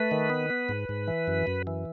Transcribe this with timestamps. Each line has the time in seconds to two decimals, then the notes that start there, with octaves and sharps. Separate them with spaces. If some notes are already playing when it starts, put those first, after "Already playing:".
Already playing: A3 B4
0.11 D#3
0.30 B3
0.50 B3
0.69 G#2
0.89 G#2
1.07 E3
1.27 F#2
1.47 F#2
1.67 E3